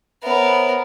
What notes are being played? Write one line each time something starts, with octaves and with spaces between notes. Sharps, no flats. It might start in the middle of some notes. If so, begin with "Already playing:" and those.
B3 A#4 C5 C#5 E5